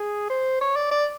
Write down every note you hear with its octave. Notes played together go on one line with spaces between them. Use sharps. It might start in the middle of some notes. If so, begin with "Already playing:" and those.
Already playing: G#4
C5
C#5
D5
D5